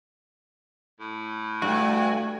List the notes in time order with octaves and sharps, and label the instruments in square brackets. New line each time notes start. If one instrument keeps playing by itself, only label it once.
[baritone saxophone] A2
[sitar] G2 [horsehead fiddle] A3 G#5 [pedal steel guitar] F#4